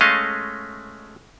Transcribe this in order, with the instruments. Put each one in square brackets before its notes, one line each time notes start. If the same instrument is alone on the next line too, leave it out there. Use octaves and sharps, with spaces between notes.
[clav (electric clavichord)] G#3 A3 C#4 D#5 F5